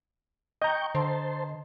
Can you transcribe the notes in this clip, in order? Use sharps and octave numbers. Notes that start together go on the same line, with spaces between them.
D#5 G5 A#5 C#6 G6
D3 C5 A5 C6